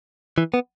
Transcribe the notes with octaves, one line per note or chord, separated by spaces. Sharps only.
E3
B3